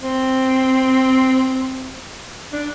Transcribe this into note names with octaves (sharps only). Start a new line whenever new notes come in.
C4
D4